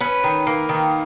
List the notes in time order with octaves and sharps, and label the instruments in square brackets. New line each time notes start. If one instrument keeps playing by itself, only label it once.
[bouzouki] C#4 B4
D#3
A#3
D#3